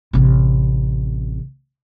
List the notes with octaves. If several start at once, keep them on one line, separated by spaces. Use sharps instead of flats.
A1 C3